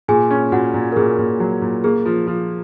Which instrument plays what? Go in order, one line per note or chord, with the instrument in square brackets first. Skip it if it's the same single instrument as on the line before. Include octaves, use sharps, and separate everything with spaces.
[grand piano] A#2 [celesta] G#4 G#5
[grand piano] C#4
[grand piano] A#2 [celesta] F#4 F#5
[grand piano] A#2
[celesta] A#4
[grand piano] A#2 [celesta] G#4
[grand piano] A#2
F#3
A#2
[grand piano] A#3 [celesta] G#4
[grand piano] F3
F3